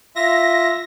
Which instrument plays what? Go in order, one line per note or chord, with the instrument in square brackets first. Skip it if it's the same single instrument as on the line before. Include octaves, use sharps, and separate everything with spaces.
[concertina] F4 E5 [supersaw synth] A#6